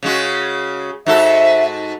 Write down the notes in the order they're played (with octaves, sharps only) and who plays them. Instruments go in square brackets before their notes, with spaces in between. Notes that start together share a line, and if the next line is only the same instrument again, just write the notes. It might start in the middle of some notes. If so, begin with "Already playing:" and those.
[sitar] C#3 G#3 F#4
[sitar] G#2 F#4 A4 [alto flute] E5